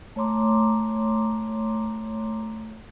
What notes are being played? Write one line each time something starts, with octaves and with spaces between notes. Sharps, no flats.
A3 C#5 A#5 C6 D6